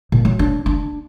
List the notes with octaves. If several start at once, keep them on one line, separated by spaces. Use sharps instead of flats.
A#2
F#3
D4
D4